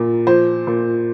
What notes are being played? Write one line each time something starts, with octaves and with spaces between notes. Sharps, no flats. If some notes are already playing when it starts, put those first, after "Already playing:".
Already playing: A#2
F3 C5
A#2